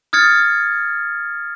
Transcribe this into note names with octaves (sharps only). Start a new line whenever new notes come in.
D#6 F6 G#6 A6 C#7